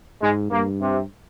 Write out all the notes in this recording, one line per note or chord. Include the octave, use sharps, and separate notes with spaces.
G#2 G#3
G2 A#3
C3